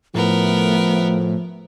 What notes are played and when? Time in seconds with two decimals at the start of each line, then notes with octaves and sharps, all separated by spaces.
0.15 A2 F3 A3 B3 A#4